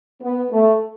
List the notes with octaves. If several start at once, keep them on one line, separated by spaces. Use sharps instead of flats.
B3
A3